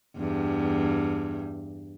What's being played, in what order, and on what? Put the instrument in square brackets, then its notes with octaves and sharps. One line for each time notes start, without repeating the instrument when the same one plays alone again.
[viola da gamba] E2 G2